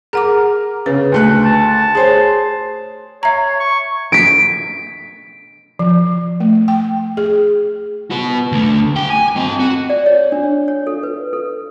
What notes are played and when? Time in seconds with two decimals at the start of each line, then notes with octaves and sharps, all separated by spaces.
0.13 G#4 A#4 F#5 D6
0.86 C#3 G#4 B4
1.12 D2 A3 F#6
1.45 A5
1.95 G#4 C5 C#5
3.23 C#5 E5 A#5
3.60 C#6
4.12 B6 D7
5.79 F3
6.40 A3
6.68 G5
7.17 G#4
8.11 F#4 B4
8.52 D2 A3
8.96 F#4 G5
9.10 G#5
9.36 C4 D#5
9.59 F#4
9.90 D5
10.06 C#5
10.32 D4
10.44 C#5
10.68 C#5
10.87 A4
11.03 B4
11.33 A4